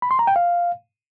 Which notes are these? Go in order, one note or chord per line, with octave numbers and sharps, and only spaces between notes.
B5
C6
A#5
G5
F5